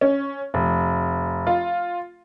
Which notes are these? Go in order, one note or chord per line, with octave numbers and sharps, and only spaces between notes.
C#4
F1
F4